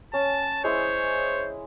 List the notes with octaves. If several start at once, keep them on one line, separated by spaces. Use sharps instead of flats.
C#4 A5
G#3 E4 C5 C#5